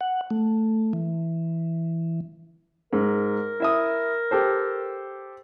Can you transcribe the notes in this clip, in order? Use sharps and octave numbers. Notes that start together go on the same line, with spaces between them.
F#5
A3
E3
G#2 A#4
E4 E5 D#6
G4 A4 C5